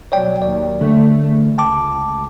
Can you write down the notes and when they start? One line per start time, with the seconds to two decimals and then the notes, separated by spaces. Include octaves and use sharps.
0.12 B2 F#3 C#5 D5 G5
0.42 D#2 D5
0.81 D3 A3
1.26 E2
1.58 C#2 G5 A5 D6